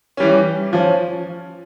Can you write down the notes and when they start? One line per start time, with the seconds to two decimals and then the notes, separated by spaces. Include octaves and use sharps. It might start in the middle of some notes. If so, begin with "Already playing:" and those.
0.17 E3 G3 C#4
0.73 F3 C#4